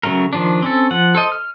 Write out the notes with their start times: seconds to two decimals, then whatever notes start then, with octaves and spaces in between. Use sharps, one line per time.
0.03 C#3 F#3 A3 A#4
0.33 D#3 F3 D4
0.62 C4 C#4 A4
0.91 F3 F#5
1.15 A4 C5 D#5
1.32 F6